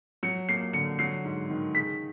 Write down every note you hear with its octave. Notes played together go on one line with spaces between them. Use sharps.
F#3 C#7
A#3 C7
D3 C#7
F#3 C7
G#2
D#3
C#3 B6